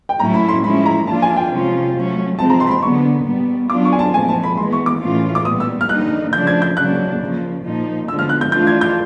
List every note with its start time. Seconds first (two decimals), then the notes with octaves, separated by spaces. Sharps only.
0.09 G5
0.19 A2 F#3 A3 C#4 E4 A#5
0.34 B5
0.48 C6
0.63 F3 G#3 C#4 E4 B5
0.86 A#5
1.07 F3 A#3 D4 F4 A5
1.22 G#5
1.37 G5
1.51 C3 F3 G#3 C#4 F4
1.95 F#3 A3 C#4
2.39 C3 F3 G#3 C4 A5
2.50 A#5
2.60 C6
2.67 B5
2.71 C6
2.82 D3 F#3 B3 C#6
3.26 A#2 G3 B3
3.70 F#3 B3 D4 F4 D6
3.85 C#6
3.92 G#5
3.99 A5
4.13 A#2 F3 A3 C4 G#5
4.28 A5
4.43 B5
4.57 E3 G#3 B3 C6
4.73 C#6
4.86 D6
5.02 A2 E3 A3 C#4 F4
5.35 D6
5.45 A#2 G3 B3 D#6
5.60 E6
5.81 F6
5.89 D3 G3 A#3 D#4 F#6
6.33 C#3 F3 A3 D4 G6
6.47 G#6
6.62 G6
6.77 C#3 F#3 A#3 D4 F#6
7.21 C#3 F3 A#3
7.64 A#2 F3 A#3 D#4
8.08 D3 F3 G#3 B3 E6
8.19 F6
8.29 F#6
8.41 G6
8.52 E3 A3 D4 F4 G6
8.67 G#6
8.81 G6